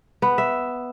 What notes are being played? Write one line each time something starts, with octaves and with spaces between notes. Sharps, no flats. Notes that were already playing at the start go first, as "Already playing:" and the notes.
B3
E5